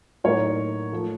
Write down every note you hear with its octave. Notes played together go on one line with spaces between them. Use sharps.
A2 F#3 A#3 D#4 A#4 C#5
F3 A3